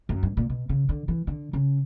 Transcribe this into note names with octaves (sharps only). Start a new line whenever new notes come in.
F#2
G2
A#2
B2
C#3
D3
E3
D3
C#3